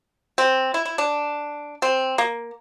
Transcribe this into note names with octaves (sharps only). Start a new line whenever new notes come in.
C4
E4
E4
D4
C4
A#3